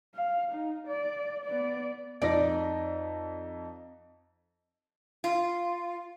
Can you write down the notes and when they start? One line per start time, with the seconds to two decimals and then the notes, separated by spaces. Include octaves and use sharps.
0.15 F5
0.52 D#4
0.87 D5
1.45 B3 D5
2.22 F2 D#4 D5 A#6
5.24 F4